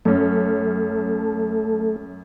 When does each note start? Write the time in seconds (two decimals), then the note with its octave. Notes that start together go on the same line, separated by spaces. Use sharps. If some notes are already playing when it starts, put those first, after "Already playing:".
0.05 F#2 A3 C#4